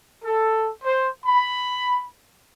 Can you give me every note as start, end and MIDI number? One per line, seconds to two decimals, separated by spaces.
0.24 0.70 69
0.84 1.10 72
1.26 2.04 83